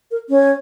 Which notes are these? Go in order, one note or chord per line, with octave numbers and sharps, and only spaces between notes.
A#4
C#4